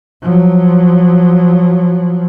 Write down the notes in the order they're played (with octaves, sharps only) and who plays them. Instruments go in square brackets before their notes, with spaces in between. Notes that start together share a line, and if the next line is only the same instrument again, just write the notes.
[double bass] F3 F#3